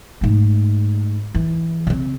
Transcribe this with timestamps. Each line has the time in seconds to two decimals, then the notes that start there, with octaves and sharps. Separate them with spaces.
0.21 G#2 A3
1.35 E3
1.87 C#3 C4